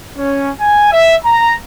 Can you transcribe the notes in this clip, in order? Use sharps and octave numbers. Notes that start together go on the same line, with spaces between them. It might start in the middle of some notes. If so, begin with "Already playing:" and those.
C#4
G#5
E5
A#5